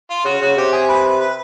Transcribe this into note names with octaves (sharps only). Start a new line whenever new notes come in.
F4
C#3 F#4
C#3 F#4
C3 G4
G#4
B4
B4
B4